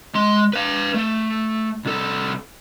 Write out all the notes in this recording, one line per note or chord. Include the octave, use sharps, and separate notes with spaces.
G#3 C6
B4 F5
A3
C2 A4